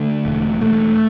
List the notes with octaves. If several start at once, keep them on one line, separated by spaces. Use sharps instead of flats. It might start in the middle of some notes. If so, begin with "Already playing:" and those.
Already playing: D3 A3
E1
E1 A3